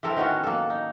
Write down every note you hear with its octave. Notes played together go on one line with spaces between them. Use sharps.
E3 C4 A4 A#4
D#3 B3 C#4 F#4
A#3 A4
D#4